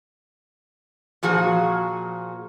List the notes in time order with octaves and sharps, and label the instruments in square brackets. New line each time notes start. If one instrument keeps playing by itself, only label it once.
[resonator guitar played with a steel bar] A#2 F3 F#4 G#4